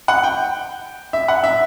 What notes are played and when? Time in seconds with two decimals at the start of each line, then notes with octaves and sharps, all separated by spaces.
0.08 F#5
0.24 G5
1.13 E5
1.28 F#5
1.44 E5